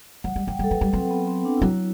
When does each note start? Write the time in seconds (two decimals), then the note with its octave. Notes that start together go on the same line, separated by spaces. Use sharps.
0.24 F#3 F#5
0.36 G3
0.47 F#3 G5
0.59 G3 A4
0.70 F#3 B4
0.81 G3
0.93 F#3 C4
1.11 B3
1.27 C4
1.45 D4
1.57 E4
1.62 F#3 F#4